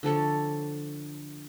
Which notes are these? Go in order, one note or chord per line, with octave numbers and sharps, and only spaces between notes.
D3 F3 A4 C#5